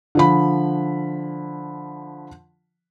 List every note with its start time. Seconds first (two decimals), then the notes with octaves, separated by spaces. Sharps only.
0.15 D3 F3 B5